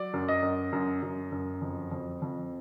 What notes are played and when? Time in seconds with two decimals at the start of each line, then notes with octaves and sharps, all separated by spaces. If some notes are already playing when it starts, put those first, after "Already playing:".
Already playing: F#3 D5
0.13 F#2
0.28 D#5
0.43 F#2
0.72 F#2
1.02 F#2
1.32 F#2
1.62 F2
1.91 F2
2.22 F2